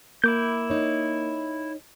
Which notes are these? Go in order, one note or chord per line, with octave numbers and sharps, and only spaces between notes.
A#3 E4 A#4 D6 G6
D#4 C#5